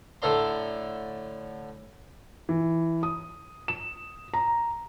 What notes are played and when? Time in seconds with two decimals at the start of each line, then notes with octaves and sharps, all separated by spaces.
0.22 A2 D3 A4 D5 A#5 C6
2.49 E3
3.03 D#6
3.68 E7
4.34 A#5